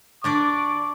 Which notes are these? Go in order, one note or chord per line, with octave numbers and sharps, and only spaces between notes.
D3 D4 D5 C#6 D6